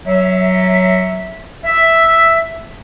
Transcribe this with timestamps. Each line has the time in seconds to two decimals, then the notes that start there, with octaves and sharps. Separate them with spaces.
0.05 F#3 E5
1.63 E5